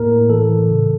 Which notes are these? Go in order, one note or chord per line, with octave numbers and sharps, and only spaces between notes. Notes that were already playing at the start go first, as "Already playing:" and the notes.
Already playing: A2 A#3 A#4
A2
E3 A4
E3
C#3